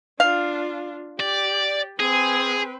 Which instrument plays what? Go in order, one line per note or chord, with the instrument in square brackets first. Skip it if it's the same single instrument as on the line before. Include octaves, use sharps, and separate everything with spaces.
[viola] D4 F4 [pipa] F5
[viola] G4 [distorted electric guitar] D5
[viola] C4 B4 [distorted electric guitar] G#4